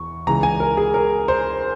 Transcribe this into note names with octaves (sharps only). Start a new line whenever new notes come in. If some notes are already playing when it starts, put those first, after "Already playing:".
Already playing: E2 C#6
C#2 C#3 E3 A#5
G#5
A#4
G#4
A#4
C5